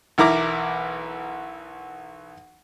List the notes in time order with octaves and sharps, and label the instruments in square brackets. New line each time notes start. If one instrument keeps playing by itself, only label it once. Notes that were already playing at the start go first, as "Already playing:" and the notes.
[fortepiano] B1 E3 E4 A#4 A#5 D6